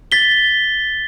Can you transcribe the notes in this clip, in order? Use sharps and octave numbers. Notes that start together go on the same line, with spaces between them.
A6 B6 G7